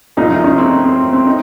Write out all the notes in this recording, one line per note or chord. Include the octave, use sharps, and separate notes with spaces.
C2 A#2 F3 D#4
D#4
C#4
C4
C4
C4
D#4